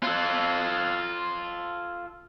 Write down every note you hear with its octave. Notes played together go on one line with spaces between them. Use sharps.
F4 A4